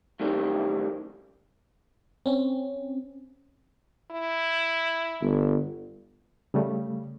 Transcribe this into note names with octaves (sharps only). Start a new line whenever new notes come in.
F#2 A2 D#3 G3 C4
C4 C#4
E4
G1
C#3 G3 A3